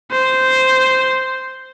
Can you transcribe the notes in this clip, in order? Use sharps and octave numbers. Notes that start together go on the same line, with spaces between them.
C5